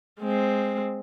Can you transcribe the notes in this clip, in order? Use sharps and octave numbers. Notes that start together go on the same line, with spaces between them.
G#3 C4